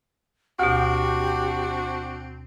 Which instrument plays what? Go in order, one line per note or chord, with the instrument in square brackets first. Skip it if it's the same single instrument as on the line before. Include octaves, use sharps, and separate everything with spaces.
[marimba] D2 B2 [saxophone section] C4 D4 F#4 [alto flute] G4